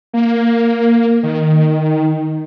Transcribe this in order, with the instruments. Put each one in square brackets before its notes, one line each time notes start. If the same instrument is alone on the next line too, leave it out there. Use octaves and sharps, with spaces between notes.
[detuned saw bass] A#3
D#3